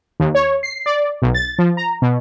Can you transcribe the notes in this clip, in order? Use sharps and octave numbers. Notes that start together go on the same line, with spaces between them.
D#2
C#5
C7
D5
B1
A6
F3
A#5
B2